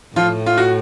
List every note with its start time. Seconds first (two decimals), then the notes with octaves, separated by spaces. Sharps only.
0.16 A2 F3 F4
0.46 F4
0.58 F#4